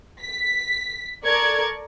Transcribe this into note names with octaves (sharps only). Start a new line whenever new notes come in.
B6
A4 A#4 D5 C#6 G#6